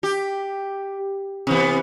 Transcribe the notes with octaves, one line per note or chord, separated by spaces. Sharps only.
G4
C3 E3 B3